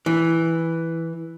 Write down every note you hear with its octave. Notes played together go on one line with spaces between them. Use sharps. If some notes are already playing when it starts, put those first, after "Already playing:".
E3